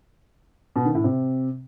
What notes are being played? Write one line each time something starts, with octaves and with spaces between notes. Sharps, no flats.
B2
D#3
A2
C3